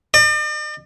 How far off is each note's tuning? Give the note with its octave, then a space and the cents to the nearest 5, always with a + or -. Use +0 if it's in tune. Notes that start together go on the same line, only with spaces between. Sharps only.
D5 +45